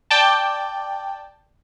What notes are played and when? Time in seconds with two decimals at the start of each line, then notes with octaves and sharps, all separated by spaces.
0.11 D5 G5 A5